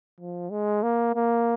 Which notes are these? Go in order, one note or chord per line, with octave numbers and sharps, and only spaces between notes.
F3
G#3
A#3
A#3